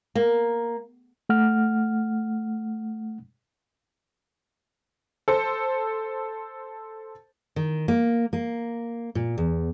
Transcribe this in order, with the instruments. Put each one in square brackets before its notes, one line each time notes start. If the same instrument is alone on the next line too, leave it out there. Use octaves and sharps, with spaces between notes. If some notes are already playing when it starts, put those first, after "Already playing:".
[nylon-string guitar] A#3
[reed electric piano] A3 F#5 F6
[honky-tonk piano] A4 C5
[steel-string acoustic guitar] D#3
A#3
A#3
A#2
E2